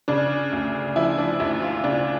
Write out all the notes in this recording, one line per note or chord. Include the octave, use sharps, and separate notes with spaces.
C#3 D4
D2
F3 E4
D4
D2 E4
F4
C#3 D4